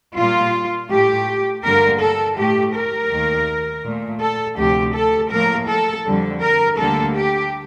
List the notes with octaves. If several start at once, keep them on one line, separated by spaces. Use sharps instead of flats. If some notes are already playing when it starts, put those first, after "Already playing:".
A#2 G3 A#3 F4
A2 A3 G4
G2 D3 G3 A#3 A#4
A4
A2 A3 G4
A#4
D#2 D#3 A#3
A#2 A3
A4
D2 C3 F3 A3 G4
A4
A2 F3 A#3 A#4
A4
F2 D3 G3
A#4
D2 D3 G3 A#3 A4
G4